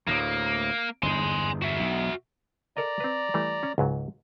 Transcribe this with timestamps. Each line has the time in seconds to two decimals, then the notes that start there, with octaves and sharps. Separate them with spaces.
0.07 D2 A2 A#3
1.03 G1 E2 G#2 G#5 C6
1.62 F#4 E5
1.80 B1
2.77 A4 A#4 D5 D#5 A#5
3.00 C4 B4
3.34 E3 G3 A3
3.63 C#4
3.78 C#2 G#2 F#3